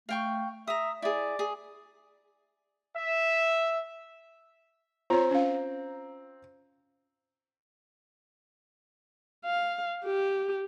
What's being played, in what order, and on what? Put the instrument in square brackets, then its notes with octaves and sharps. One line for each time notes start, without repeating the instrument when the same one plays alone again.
[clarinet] A3 [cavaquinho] F5 G5 C#6
[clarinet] E5 [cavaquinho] A#5 D#6
[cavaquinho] E4 G#4 [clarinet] D5
[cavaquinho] G#4
[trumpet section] E5
[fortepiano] C4 A#5 [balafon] F4 C#5
[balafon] C#4 F5
[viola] F5
G4